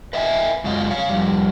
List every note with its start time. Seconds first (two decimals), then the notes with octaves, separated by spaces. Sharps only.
0.13 B4 D#5 E5 G5 G#5
0.64 F#2 G#3 F4
0.91 C#5 F5
1.09 F2 G3